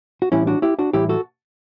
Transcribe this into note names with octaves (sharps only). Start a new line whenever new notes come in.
F#4
A2 E3 G3 C#4 E4
D4 F#4
E4 G4
D4 F#4
A2 E3 G3 E4 G4
F#4 A4